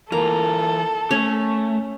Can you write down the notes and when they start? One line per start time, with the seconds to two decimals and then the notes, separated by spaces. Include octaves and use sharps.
0.12 E3 A#3 F4 A4 A#4 A#5
1.11 A3 C#4